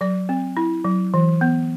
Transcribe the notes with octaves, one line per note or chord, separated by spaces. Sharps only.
F#3 D5
C4
E4
F#3
E3
B3